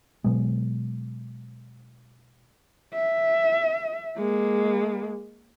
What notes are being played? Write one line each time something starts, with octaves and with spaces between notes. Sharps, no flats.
B2 F#3 G#3
E5
G#3 A#3